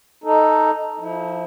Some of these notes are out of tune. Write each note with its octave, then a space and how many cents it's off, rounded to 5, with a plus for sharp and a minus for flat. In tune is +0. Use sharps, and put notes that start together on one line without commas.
D#4 +0 A4 +0
F3 +0 E4 -30